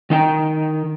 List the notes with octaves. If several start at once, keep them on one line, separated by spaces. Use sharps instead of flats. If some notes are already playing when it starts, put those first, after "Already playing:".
D#3 D#4 G5